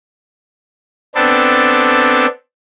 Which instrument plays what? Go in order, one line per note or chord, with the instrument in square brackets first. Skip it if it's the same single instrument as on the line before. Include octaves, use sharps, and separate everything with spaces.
[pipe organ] B3 C4 D4 A4